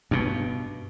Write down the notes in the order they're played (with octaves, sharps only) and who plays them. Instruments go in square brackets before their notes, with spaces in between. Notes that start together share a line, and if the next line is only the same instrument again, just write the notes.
[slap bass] G2 B2